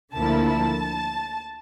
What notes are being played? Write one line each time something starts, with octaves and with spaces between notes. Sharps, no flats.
D2 D3 F3 A#3 E4 A5
A5